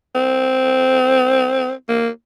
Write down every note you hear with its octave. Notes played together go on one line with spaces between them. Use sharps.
C4
A#3